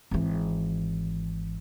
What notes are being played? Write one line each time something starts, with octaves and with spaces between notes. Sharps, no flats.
G#1 E3